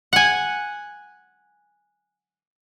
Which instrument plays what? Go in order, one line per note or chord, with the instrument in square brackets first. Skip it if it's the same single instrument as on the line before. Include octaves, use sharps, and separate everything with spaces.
[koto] F#5 G#5